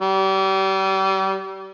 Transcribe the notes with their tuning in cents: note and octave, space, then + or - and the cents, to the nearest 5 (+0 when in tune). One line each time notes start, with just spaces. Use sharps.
G3 -35